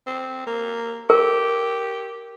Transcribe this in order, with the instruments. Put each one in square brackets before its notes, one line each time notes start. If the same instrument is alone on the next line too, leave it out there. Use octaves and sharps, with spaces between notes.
[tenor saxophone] C4
A#3
[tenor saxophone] G4 [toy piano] A#4